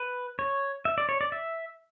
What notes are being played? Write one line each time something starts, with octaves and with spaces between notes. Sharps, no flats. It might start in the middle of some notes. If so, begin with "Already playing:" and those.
Already playing: B4
C#5
E5
D5
C#5
D5
E5